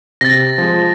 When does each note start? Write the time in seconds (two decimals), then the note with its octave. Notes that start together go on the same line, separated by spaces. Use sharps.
0.21 C3 A6 A#6
0.58 F3 G#3